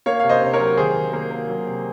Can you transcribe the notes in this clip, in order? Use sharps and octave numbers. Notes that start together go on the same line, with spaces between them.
A#3 C#5 F5
C3 F5
C5 D#5
C3 C5
A#4 C#5
F#3
D#3 G#4 C5
D#3
A#3
A#3
F#3
C3